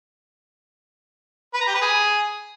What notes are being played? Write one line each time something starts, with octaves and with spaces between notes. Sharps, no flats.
B4
A#5
G4
B4
G#4